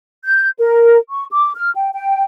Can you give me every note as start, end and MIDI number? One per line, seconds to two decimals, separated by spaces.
0.25 0.49 91
0.59 0.97 70
1.10 1.24 85
1.32 1.51 86
1.56 1.71 89
1.75 1.89 79
1.93 2.23 79